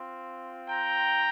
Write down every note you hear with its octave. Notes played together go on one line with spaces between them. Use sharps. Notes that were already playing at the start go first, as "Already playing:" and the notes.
Already playing: C4 F4
G5 A#5